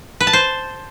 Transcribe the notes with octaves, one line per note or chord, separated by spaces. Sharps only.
B4
A5
C5